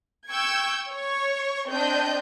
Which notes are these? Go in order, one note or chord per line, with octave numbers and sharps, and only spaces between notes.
G5 C#6 E6 G6 G#6
C#5 C#6
C4 D4 D#5 G5 G6